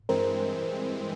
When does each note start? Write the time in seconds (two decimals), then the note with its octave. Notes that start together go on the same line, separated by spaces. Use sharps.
0.09 G2 E3 G#3 C4 A#4 C5